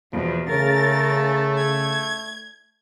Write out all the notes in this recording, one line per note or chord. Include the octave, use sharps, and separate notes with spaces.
E2 B2 F3
C#3 A3 A#4 A6
G#6